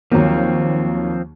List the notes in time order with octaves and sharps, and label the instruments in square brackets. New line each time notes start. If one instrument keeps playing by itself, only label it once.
[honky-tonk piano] D#2 F#3 A#3 [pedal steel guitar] F3 C4